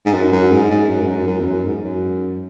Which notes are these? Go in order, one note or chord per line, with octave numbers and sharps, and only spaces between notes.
G#2
F#2
F#2
G#2
G#2
F#2
G#2
F#2
F#2
E2
F#2
G#2
F#2